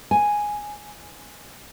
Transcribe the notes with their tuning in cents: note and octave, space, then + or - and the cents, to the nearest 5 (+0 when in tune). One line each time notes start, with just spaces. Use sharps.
G#5 +0